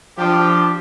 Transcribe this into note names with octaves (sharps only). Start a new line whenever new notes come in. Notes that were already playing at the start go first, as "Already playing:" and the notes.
F3 D4 G4